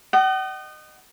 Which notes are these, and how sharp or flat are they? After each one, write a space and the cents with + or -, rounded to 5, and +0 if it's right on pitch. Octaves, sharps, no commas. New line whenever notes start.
D#5 -25 F#5 +45